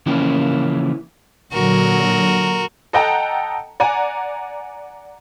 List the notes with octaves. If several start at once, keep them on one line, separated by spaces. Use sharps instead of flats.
C#3 E3 F3 A#3 C#4 E4
A#2 D3 F#3 F#4 A#4
A4 D#5 F#5 G5 A5 A#5
D5 F#5 G#5 A#5